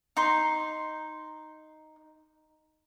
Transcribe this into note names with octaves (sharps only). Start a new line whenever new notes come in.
D#4 C6